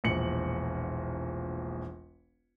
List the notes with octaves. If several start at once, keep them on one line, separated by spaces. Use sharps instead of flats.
E1 A#1 C#7 F#7